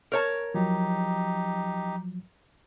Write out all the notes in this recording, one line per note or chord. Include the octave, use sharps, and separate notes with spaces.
A#4 C#5 A5
F3 F#3 D#4 G4